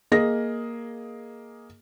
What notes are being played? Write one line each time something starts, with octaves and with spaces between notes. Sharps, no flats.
A#3 G#4 D#5 A#6